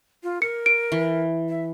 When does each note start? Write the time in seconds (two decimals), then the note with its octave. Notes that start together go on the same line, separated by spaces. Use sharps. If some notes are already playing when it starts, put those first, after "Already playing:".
0.23 F4
0.42 A#4 C#7
0.66 D7
0.92 E3
1.49 E5